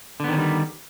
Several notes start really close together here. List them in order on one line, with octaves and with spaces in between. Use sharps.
D3 B3 D#3 C#4 G3